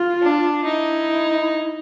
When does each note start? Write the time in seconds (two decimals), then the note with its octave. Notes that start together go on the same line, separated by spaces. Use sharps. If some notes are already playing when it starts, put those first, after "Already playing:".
Already playing: F4
0.22 D4
0.65 D#4 E4